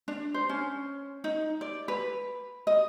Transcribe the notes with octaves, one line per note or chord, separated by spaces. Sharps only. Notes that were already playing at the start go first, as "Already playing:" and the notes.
D4
C5
C#4
D#4
D5
B4
D#5